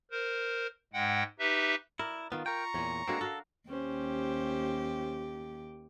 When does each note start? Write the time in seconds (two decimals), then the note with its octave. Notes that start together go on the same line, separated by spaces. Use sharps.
0.11 A#4 C5
0.93 G#2 G#3 F#5 G5
1.39 D#4 G4 B4 E5
1.99 E4 A#4 D5
2.32 D#3 B3 F4
2.46 A#4 G5 A#5 C#6
2.74 E2 A#2 C#5
3.08 G#3 A#3 C4 D4 F#4 A4
3.21 F#4 A4 A#4 F5
3.69 D#2 C#4 G4 C5